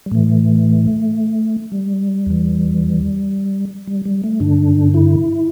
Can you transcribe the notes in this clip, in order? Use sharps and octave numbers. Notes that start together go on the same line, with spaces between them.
G3
A2 E3 A3
G3
E2 E3
G3
G3
A3
G2 D3 D4
E4